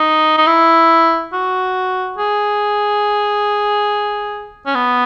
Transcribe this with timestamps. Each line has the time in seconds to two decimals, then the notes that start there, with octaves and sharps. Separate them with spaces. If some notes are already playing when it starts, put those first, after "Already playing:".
Already playing: D#4
0.38 D#4
0.47 E4
1.33 F#4
2.18 G#4
4.66 C#4
4.75 B3